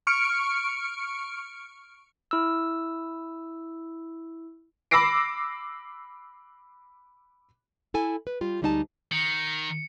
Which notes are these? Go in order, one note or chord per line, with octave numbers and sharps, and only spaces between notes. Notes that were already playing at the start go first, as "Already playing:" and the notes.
C#6 F6 C#7 D7
E4 E6
B5 D6 E6 A#6 C7 D7
E4 A4 G#5
B4
G3 F4 G4
D2 G3 G#3 D#4 F5 A5
D#3 C#7